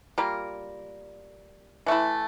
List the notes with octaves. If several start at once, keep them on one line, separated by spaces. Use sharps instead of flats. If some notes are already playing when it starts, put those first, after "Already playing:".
G3 A#3 F4 A#4
E3 A3 E4